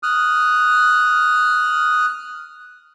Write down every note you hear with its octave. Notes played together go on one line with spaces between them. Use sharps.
D#6 F6 F#6